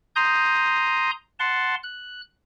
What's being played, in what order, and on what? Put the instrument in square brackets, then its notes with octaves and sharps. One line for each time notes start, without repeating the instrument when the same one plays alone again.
[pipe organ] A#5 C6 D#6 G6
F#5 A5 C6
F#6